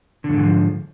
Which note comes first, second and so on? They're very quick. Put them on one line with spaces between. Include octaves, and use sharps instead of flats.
D3 F2 G#2 E3 F3